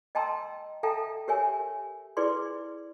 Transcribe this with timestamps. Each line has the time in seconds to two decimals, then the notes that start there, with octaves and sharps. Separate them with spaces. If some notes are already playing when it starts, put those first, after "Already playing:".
0.15 D#5 G5 A5 A#5 C6 E6
0.83 A4 E5 F5 G5 A5 A#5
1.28 G4 A#4 C#5 E5 G#5
2.17 E4 G#4 B4 D5 C6